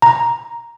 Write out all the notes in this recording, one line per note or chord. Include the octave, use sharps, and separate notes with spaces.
A#5